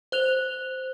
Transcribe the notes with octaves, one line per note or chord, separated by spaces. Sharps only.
C5 F#6 F7